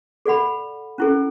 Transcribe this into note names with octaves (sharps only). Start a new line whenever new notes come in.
A4 D5 F#5 B5
C#4 E4 A4